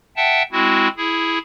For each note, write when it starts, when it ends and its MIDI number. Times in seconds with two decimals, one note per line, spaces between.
0.17 0.43 76
0.17 0.43 78
0.17 0.43 79
0.17 0.43 81
0.52 0.88 56
0.52 0.88 60
0.52 0.88 64
0.52 0.88 66
0.97 1.38 64
0.97 1.38 68